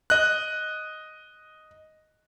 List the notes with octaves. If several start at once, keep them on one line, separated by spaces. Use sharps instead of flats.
D#5 F#6